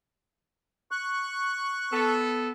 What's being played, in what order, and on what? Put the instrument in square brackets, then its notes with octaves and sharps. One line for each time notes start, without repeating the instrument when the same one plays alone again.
[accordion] C#6 F#6
[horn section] B3 A4